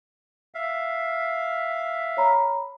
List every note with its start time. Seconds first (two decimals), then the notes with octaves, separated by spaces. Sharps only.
0.54 E5 F5
2.17 C#5 A#5 B5